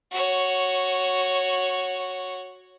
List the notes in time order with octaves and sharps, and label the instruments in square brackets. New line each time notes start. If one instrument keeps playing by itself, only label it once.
[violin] F#4 C#5